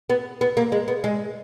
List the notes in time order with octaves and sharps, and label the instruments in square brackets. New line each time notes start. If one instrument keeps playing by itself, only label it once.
[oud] B3
B3
A#3
G#3
B3
G#3